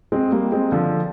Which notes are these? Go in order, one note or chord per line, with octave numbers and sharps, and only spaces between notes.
G#3 C4
G3 A#3
G#3 C4
D3 F3